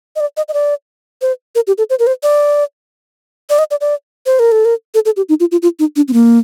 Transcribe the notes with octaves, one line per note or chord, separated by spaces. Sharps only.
D#5
D5
D#5
D#5
D5
C5
A#4
G4
A4
C5
A#4
C5
D5
D5
D#5
D5
D5
C5
A#4
A4
A#4
A4
A4
G4
D#4
F4
F4
F4
D#4
D4
C4
A#3